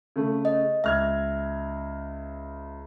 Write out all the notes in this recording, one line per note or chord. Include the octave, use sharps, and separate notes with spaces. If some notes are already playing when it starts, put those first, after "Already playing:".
C#3 A3
D#5
C#2 E5 F6 G#6